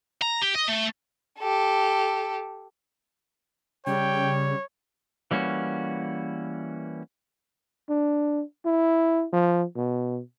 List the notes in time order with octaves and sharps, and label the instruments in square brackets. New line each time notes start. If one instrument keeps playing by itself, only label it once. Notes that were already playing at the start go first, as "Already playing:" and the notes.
[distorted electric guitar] A#5
G4
D#5
A3
[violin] G4 A4
[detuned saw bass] C#3 [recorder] G3 [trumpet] C#5 [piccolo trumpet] G5
[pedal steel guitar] E3 G3 A#3 C#4 F#4
[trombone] D4
E4
F3
B2